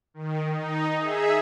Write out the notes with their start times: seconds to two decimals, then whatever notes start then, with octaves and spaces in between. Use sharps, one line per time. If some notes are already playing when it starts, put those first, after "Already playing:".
0.14 D#3
0.49 D#4
0.96 G#4 E5